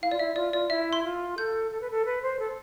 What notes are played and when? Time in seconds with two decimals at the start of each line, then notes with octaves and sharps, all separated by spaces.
0.02 E4 F5
0.11 F4 D5
0.19 E4 E5
0.36 F4 D5
0.53 F4 D5
0.70 E4 E5
0.93 C6
1.04 F4
1.38 A4 G6
1.71 A4
1.81 B4
1.91 A4
2.05 B4
2.22 C5
2.39 A4